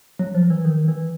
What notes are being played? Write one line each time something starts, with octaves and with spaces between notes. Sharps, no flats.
F#3
F3
E3
D#3
E3